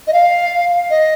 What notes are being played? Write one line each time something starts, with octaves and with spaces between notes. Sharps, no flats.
D#5
F5
D#5